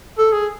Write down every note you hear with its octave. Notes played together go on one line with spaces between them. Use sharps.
A4
G#4